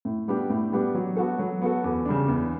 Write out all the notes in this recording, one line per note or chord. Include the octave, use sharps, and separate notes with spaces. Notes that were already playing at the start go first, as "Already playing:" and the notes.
A2
G3 B3 D4 G4
A2
G3 B3 D4 G4
F#3
B3 F#4 A4
F#3
B3 F#4 A4
E2
C#3 G3 D4
E2